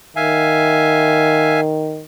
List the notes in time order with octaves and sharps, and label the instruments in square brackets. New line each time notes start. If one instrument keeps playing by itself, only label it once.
[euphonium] D#3 [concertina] E5 F5 G#5